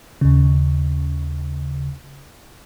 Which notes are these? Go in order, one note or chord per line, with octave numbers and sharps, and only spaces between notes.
D#2 C#3